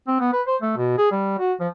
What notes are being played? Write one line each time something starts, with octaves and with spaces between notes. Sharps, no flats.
C4
B3
B4
C5
A3
B2
G#4
G3
F#4
F3